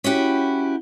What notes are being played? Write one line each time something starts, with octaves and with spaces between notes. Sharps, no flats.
C#4 E4 F#4 G4